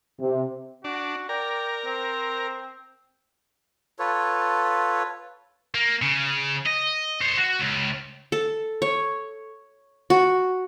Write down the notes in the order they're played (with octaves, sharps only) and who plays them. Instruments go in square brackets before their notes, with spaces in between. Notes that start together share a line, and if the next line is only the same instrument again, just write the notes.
[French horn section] C3
[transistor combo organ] D4 [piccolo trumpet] F#4
[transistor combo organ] A#4 [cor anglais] D5 [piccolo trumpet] G5
[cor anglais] C4 [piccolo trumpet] C5
[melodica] F4 A4 B4 C#5
[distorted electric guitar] A#3
C#3
D#5
C5 C#5
F#4
C#2
[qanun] A4
C#5
F#4